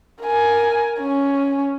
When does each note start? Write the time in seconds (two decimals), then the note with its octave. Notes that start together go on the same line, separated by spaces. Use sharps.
0.23 A#4 G#5
1.01 C#4